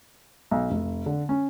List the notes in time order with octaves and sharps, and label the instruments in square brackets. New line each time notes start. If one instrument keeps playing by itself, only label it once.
[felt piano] B1
F1
D3
C#4